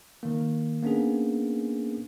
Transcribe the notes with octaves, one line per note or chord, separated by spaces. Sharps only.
D#3 A#3
A#3 B3 C#4 D4 G#4